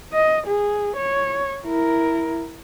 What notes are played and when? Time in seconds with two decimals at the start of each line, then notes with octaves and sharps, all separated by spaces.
0.13 D#5
0.47 G#4
0.96 C#5
1.65 E4 A#4